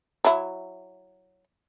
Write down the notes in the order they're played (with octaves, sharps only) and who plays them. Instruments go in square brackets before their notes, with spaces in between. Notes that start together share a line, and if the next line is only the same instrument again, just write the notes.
[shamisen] F#3 E4